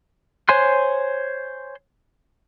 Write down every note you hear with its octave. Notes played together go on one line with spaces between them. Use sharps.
C5 C#5 G#5 C6 F#6